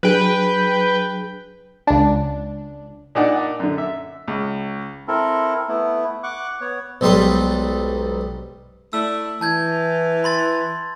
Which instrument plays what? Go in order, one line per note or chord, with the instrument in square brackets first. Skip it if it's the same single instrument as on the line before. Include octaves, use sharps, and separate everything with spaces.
[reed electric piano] F#3 D4 G#4 [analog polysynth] B4 G5
[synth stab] C#2 D4
[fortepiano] A#2 D4 D#4 D5 F#5
F#2 D3
E5
C#2
[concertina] C4 E4 A4 A#4
A3 B3 E4
F#5 C#6 D6 F#6
B3 C#5 F#5
[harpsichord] B1 G#2 G3 B4 C6
[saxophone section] A3 E4 D5 [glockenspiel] E6
[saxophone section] E3 [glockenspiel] A5 G6 G#6
[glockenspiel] B5 C6 A6